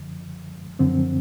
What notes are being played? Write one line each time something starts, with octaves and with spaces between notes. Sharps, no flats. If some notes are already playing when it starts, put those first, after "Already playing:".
Already playing: F#2 D3 F3
F#2 D3 F3 C4